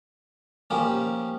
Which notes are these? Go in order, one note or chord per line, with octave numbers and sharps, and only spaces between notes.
F3 A#3 C#4 G4